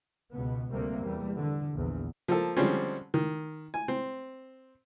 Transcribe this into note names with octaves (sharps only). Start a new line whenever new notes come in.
C#2 B2 B3
D2 C3 G3 A#3
E2 G3
D3
A#1 E2
F3 A#3 A4
D3 F3 G3 G#3 C4 C#4
D#3
G#5
C4